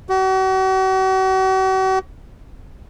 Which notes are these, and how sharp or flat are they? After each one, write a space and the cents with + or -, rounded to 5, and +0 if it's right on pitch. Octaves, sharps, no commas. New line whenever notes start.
F#4 +40